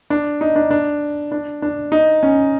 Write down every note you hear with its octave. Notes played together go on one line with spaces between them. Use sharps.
D4
D#4
D4
D4
D4
D4
D#4
C#4